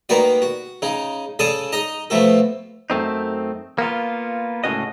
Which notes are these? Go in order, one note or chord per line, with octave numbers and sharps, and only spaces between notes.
D#3 A#3 B3 F#4 D5
F#4
C#3 D#4
C#3 G#4 A4 D5 A5 D#6
D#4 D#5 A#5
B2 F3 A3 F#4 A4
F#2 A3 C4 D#4
A#3 B3 F4
C#2 A2 A3 C#4 F#4 D#5